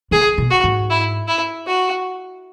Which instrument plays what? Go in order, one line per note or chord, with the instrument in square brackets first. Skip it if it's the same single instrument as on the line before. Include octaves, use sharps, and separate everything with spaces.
[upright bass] C#3 [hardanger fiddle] G#4
[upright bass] B2
[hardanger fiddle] F#4
[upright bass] G#2
[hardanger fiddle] E4
E4
F#4